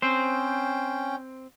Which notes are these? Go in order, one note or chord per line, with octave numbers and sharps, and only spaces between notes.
C4 C#4 C5 G5